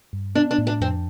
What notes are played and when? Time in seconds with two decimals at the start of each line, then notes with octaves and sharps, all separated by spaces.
0.13 G2
0.35 B3 D4
0.51 D4
0.58 A2
0.67 D4
0.81 F2 C4